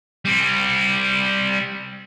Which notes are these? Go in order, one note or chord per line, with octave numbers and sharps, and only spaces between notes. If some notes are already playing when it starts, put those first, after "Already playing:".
G3 C4